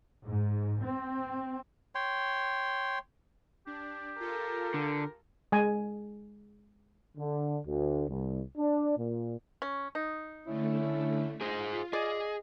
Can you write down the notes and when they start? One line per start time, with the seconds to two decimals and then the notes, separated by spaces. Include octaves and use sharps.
0.25 G#2
0.83 C4
1.95 C#5 G5 C6
3.67 D4 G4
4.20 F4 A4 A#4
4.74 D3
5.52 G#3 G#5
7.17 D3
7.66 D2
8.09 C2
8.58 D4
8.98 A#2
9.62 C#4
9.95 D#4
10.47 D3 A3 C#4 E4
11.41 F4 G#4 C5
11.93 G#4 D5 D#5